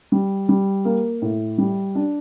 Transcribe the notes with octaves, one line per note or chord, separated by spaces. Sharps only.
G3
G3
A#3
A2
G3
D4